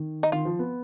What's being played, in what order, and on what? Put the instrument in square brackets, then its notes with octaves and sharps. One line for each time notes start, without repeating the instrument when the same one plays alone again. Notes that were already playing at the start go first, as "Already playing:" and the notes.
Already playing: [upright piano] D#3
[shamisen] D#4
[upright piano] D#3 [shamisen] F4
[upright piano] F3
B3